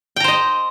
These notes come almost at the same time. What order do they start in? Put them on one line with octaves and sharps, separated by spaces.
G5 A#5 C5 D#5